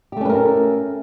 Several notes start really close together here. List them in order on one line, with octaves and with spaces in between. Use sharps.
G4 A3 C#4 B4 A#4